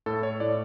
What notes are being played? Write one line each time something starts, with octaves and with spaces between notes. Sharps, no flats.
A2 A4
C#5
A2 D5